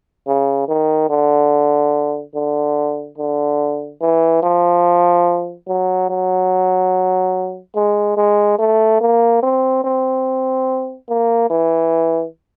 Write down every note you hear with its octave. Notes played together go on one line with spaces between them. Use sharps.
C#3
D#3
D3
D3
D3
E3
F3
F#3
F#3
G#3
G#3
A3
A#3
C4
C4
A#3
E3